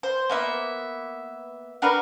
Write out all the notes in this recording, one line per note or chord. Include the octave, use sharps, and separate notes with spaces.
C5
A#3 B3 E5
D4 F#4 A#4 B4